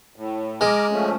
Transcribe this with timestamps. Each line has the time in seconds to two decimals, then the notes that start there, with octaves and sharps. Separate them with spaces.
0.16 A2
0.61 G#3 A#5 D6 F6
0.91 F3 A3 C#4